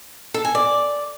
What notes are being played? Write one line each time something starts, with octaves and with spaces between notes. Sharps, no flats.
A4
G#5
D5